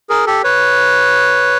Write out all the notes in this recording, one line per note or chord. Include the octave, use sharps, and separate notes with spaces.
G#4 A#4
G4 A4
B4 C#5